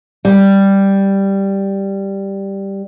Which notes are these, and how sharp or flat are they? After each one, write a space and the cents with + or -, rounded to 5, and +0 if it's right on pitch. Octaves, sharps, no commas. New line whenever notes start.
G3 +0